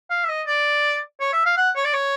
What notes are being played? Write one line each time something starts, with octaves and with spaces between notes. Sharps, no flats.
F5
E5
D#5
D5
C#5
E5
F5
F#5
C#5
D5
C#5